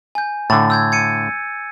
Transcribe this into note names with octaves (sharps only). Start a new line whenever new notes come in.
G#5 G6
A2 D3 A6
E6 G6 G#6
G#6 C#7 D#7